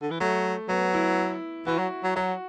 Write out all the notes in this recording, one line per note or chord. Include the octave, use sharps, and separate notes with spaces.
D3
E3
F#3 A3
F#3 B3
E4
E3 F#4
F#3
F#3
F#3 F#4